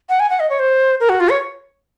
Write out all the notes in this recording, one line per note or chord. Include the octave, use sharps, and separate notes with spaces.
F#5
G#5
F#5
D#5
C#5
C5
A#4
F#4
F4
C#5